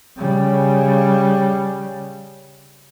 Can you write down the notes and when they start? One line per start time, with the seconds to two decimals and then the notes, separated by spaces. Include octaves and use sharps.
0.17 C#3 G3